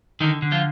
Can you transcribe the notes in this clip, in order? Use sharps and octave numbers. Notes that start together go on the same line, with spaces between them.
D3 D#3 D#4
D3
F3 F4